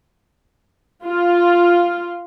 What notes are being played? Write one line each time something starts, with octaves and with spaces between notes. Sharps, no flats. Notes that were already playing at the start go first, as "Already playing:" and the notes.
F4